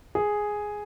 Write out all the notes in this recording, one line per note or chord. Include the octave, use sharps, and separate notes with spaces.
G#4